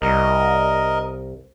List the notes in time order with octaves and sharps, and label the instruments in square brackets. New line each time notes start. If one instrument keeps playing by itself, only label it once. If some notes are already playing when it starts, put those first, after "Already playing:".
[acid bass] C2 [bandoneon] A#4 D#5